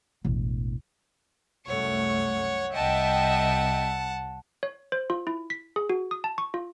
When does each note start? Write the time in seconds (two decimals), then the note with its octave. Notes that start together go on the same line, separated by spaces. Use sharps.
0.25 E1 A1
1.66 C2 F#2 A3 C#5 F#5
2.73 C2 D#5 E5 F#5 G5 A5
4.63 C#5
4.92 C5
5.10 F4
5.27 E4
5.50 B6
5.76 G#4
5.90 F#4
6.11 D#6
6.24 A5
6.38 C#6
6.54 F4